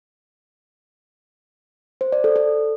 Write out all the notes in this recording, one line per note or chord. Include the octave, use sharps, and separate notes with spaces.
C5
D5
A4
A4